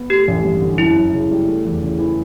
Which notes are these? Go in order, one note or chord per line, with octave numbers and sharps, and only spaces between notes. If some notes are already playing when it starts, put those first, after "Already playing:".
Already playing: B3
A3 G4
A1
G2
D3
F#2 E4
F#2
C#3
G3
A3
E2
C#3
E3